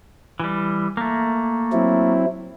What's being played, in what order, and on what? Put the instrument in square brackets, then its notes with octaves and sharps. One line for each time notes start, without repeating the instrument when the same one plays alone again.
[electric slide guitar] E3 G3
A3 A#3
[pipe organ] F#3 C4 E4